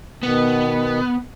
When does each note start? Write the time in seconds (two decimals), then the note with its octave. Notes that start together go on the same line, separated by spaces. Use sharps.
0.23 B2 D#3 B3